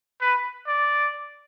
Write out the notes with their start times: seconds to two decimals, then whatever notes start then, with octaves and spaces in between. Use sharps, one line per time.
0.21 B4
0.67 D5